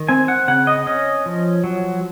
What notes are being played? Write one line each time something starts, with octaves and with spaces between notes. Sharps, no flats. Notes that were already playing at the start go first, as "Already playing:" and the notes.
Already playing: D#3
C4 G#5
F#5
C#3 F#5
D#5
C#4 D#5
F3
F#3